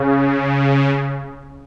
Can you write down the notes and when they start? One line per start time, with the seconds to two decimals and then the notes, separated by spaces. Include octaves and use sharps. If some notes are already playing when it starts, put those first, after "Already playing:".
Already playing: C#3